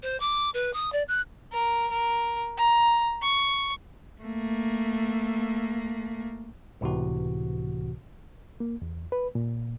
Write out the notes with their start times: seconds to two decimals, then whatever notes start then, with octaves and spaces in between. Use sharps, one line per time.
0.03 C5
0.20 D6
0.54 B4
0.73 D#6
0.92 D5
1.08 F#6
1.52 A#4
1.90 A#4
2.57 A#5
3.22 C#6
4.22 A3 A#3
6.81 C#2 A2 C3 E3 F#4
8.60 A#3
8.82 E2
9.12 B4
9.35 A#2